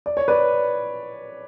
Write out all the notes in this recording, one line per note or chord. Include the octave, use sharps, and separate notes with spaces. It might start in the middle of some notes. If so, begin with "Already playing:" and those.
D5
C#5
B4 D5